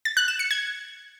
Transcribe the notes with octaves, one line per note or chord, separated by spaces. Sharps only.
A6
F#6
E7
C#7
G#6